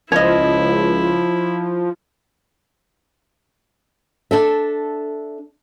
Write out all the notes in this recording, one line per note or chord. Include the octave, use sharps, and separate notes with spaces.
C#2 F3 E4 C#5 D#5
D4 A4 E5